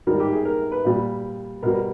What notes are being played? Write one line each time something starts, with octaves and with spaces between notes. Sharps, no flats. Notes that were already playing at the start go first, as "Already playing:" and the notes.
G#2 D#3 G3 A#4
G4
G#4
A#4
B4
A#2 G3
B2 G3 A#4